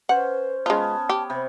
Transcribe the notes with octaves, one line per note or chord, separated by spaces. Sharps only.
C#4 B4 C5 F#5
G#3 B3 C#4 F4 A5
G4
C3 B5